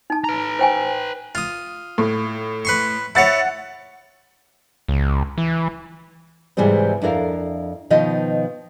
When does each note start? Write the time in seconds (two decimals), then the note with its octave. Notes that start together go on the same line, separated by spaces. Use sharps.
0.10 D#4 A5
0.24 B4 A#5
0.59 C5 G5 G#5
1.35 F4 D#6
1.98 A2
2.65 B4 C6 C#6
3.15 E4 C#5 F#5 A6 C#7
4.88 C#2
5.38 E3
6.57 G#2 C3 E3 G3 G#3 C4
7.02 F2 D4 E4 A#4 F5
7.90 B2 D#3 F3 F4 D#5